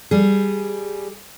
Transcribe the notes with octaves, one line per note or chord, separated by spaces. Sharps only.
G3 G#4